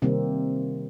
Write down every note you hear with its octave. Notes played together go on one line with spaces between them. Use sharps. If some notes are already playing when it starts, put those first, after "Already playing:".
C3 D#3 G3 A#3 C4